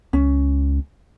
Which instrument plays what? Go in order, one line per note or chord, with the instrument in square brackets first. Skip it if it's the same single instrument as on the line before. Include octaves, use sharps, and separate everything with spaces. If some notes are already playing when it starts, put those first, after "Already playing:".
[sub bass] C#2 [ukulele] C#4